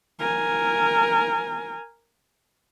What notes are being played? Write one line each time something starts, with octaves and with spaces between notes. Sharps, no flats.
A#4 G#5